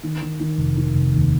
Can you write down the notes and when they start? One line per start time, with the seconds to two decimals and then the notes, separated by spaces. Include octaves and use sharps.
0.03 D#3
0.21 D#3
0.40 D#3
0.58 F1
0.77 D#3
0.94 F1
1.12 D#2